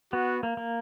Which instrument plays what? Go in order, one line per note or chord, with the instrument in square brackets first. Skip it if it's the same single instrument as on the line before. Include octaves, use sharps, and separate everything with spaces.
[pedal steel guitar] B3 [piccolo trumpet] F#4
[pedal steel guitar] A#3
A#3